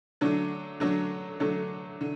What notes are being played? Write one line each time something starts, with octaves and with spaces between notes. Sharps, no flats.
D3 F#3 A3 D4
D3 F#3 A3 D4
D3 F#3 A3 D4
D3